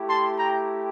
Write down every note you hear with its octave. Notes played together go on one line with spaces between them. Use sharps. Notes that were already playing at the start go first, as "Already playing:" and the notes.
Already playing: A3 E4 G4
A5 C6
G5 A#5